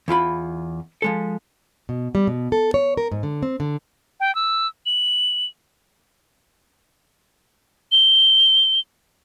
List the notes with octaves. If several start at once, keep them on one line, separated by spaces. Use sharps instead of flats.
E2 E4 F4 B5
F3 G#3 A4
B2
G3
B2
A4
C#5
A#4
G#2
D3
C4
D3
G5
E6
F#7
G7